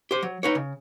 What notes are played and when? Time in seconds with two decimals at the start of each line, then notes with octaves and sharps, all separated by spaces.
0.11 G4 C5
0.22 F#3
0.43 D#4 B4 C#5
0.55 C#3